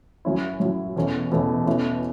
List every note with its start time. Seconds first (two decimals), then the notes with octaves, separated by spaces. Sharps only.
0.25 F#2 F#3 C#4 E4
0.60 F#2 F#3 C#4 E4
0.96 E2 B2 A3 C#4
1.32 E2 B2 A3 C#4
1.67 B2 A3 C#4 E4